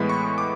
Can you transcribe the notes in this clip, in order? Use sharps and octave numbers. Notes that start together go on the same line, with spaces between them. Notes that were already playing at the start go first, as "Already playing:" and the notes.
Already playing: A2 E3 G#3 B3 B5
C#6
D6